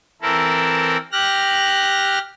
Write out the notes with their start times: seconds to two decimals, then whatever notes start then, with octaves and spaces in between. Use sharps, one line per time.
0.22 E3 C4 E4 A4 A#4
1.12 G4 F6 F#6 A#6